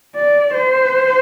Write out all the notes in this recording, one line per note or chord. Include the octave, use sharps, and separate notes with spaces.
D5
C5